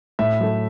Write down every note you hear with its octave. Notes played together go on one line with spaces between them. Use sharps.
A2 E5
F#3 A3